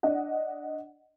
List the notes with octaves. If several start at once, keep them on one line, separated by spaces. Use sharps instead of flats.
D4 D#5 F#5